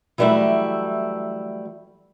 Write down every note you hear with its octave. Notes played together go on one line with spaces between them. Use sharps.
E3 F#3 G3 A3 E4